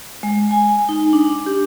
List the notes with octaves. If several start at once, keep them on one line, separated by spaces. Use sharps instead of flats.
G#3
G#5
D#4
D4
G4